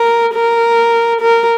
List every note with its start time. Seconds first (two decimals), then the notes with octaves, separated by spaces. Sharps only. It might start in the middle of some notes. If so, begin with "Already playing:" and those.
Already playing: A#4
0.35 A#4
1.21 A#4